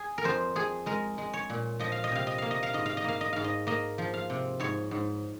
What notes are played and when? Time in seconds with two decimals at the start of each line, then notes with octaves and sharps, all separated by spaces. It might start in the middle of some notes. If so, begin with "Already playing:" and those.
Already playing: G#4
0.18 A#4
0.24 F2 C5
0.55 F2 G#4
0.86 G#3 A#4
1.18 G#3
1.33 C#5
1.50 A#2
1.79 F3 D#5
1.92 F5
2.04 D#5
2.12 C3 F5
2.27 D#5
2.38 A#3 F5
2.51 D#5
2.63 F5
2.73 G#2 D#5
2.86 F5
2.97 D#5
3.04 A#3 F5
3.21 D#5
3.33 G#2 F5
3.44 D#5
3.67 A#3 D#5
3.98 F3
4.14 F5
4.30 C3
4.60 G#2 C#5
4.91 G#2